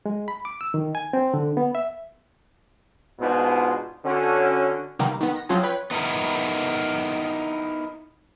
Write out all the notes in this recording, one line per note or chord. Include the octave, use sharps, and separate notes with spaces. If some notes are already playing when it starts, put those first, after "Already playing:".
G#3
B5
D6
E6
D#3
G#5
C4
D3
B3
E5
G#2 B2 B3 D4 D#4 F4
D3 C#4 F#4
C3 D#3 G3 A#3 B3
D#3 B3
A#6
F3 F#3 C4 C#4 F4 G#4
B4 C#5 G5 B5
B3 D#4 E4 A#4